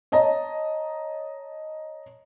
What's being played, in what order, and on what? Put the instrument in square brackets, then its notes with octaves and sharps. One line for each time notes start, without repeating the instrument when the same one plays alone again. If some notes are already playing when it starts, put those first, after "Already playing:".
[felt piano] C#5 D#5 A5 A#5